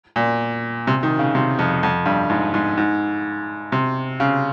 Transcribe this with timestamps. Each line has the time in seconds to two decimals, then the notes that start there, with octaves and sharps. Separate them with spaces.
0.16 A#2
0.87 C3
1.03 D#3
1.19 C#3
1.35 C3
1.59 F2
1.83 F2
2.06 G2
2.30 G#2
2.54 G#2
2.77 G#2
3.72 C3
4.20 C#3